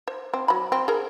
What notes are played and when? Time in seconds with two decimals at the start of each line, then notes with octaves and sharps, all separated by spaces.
0.08 C5
0.34 C4
0.48 F#3 B5
0.72 C4
0.88 G#4 A#4